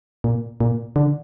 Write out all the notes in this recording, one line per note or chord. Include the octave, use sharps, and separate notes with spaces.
A#2
A#2
D3